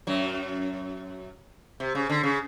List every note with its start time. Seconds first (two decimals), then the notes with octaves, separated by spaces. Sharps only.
0.07 F#2 F#3
1.80 C3
1.95 C#3
2.10 D3
2.23 C#3